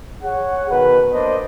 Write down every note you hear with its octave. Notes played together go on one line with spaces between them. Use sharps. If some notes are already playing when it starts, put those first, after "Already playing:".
G#4 C#5 F#5
B2 D#3 B4
A#3 D4 C5 D5 D#5